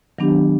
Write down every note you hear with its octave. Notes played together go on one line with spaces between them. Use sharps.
D#3 F#3 B3 D4 G4